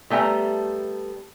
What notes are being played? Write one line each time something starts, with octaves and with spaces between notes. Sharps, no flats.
G3 A3 B3 G5 A#5